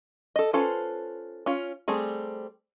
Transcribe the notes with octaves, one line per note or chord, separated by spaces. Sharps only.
A4 D#5
C#4 F4 A4 B4 C5
C#4 F4
G3 A3 C4 G#4